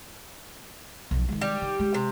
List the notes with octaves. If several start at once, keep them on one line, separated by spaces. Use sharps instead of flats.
B1 F2
D#3 G#3
G3 G4
D#3
G#3
C3